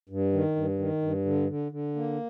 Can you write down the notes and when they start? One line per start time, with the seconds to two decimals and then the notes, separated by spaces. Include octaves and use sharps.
0.09 G2
0.33 D#3
0.56 G2
0.79 D#3
1.02 G2
1.25 D3
1.48 D3
1.72 D3
1.95 A#3